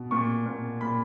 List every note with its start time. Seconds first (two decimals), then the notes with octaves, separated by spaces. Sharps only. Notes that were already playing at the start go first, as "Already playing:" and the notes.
Already playing: B2
0.11 A#2 C#6
0.46 A#2
0.81 A#2 B5